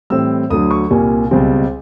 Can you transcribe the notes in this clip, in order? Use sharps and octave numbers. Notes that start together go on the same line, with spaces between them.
A2 E3 G3 C4 E6
D2 D3 F#3 D#6
C#6
C2 A#2 G3 A#3 G#5
C#2 B2 G3 C4